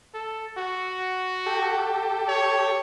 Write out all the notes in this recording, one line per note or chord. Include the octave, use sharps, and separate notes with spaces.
A4
F#4
G4 A4
C#5